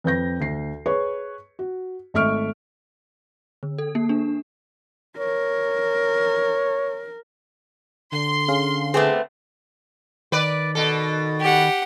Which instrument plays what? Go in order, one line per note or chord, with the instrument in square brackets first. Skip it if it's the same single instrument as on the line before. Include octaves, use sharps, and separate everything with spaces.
[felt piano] F2 B4 G6 A#6
D2 C7
G#4 B4 C#5 C#6
F#4
G#1 A3 E5 C#6 F6 D7
[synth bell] D3
A4
A#3
D4
[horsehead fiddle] A#4 [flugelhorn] C#5
[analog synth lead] D3 [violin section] C6
[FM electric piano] C#4 G#4 F5
[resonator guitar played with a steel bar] A3 B3 C4 [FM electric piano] G#4 D6
[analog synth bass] D#3 [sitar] B4 D5
[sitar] B2 A4
[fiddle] G4 F#5